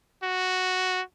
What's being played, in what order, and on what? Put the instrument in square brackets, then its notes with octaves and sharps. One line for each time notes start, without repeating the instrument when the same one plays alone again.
[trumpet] F#4